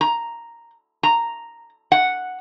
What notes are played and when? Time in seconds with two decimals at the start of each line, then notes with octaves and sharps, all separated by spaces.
0.01 A#5
1.03 A#5
1.92 F#5